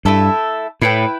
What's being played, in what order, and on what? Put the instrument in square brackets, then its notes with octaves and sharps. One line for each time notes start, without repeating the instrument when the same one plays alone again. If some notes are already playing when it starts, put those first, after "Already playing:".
[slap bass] G2 [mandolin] A3 E4 A4 E5
[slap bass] A2 [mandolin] E4 B4 G5